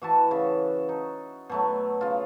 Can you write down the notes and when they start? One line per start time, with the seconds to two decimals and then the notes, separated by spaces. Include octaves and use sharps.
0.02 E3 F#4 E5 A5
0.31 C#3
0.89 D#4
1.49 B2 F#3 A3
2.01 C#3 F4